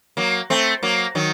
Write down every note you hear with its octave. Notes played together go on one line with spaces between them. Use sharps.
F#3 A#3
A3 C4
F#3 A#3
D#3 F#3